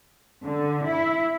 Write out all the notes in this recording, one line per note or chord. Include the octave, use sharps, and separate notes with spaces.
D3
E4